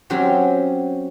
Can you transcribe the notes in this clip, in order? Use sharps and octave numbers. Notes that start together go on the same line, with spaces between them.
F#3 C4 C#4 F#4 G4